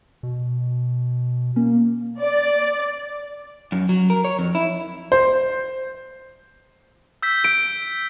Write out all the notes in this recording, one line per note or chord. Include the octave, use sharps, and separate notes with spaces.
B2
A#3 C#4
D5
F#2
F#3
A#4
C#5
F2
E4
C5
E6 G6 B6
D7